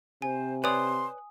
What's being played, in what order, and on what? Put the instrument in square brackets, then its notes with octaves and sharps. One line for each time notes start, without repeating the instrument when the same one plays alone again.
[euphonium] C3 [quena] C5 [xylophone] G#5
[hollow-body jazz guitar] B4 C#5 D5 [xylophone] G#5 D#6 [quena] C6